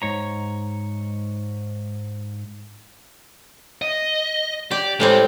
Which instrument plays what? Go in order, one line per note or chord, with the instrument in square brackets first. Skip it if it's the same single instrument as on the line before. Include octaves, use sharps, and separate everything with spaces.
[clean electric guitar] G#2 C#5 A#5
[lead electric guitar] D#5
[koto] G4 [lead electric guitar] D5
[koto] A2 G3 C4 [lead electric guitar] G#3